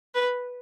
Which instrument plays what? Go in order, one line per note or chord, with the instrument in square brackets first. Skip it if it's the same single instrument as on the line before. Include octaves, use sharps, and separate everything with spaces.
[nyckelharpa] B4